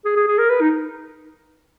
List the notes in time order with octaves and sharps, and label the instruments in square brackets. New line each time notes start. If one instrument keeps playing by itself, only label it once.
[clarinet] G#4
G#4
G#4
A#4
B4
D#4